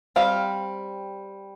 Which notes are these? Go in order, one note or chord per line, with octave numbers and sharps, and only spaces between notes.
G3 C4 F5